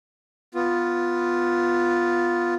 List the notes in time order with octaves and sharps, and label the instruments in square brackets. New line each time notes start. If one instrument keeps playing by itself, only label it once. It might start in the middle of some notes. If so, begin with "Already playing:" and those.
[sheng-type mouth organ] B3 F4